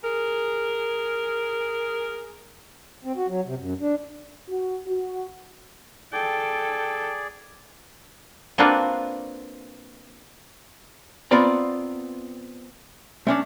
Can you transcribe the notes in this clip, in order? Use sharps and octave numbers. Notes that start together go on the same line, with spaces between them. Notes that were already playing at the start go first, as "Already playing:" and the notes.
G#4 A#4
C4
F#4
F#3
C3
F#2
D4
F#4
F#4
G#4 A4 D5 G5
A#3 C4 D4 F4 F#4 B4
B3 C4 F4 D5 A#5
A3 C#4 D4